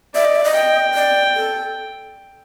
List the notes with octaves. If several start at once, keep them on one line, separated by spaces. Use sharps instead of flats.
D5 E5
D#5
E5
D#5
G5
D5
A4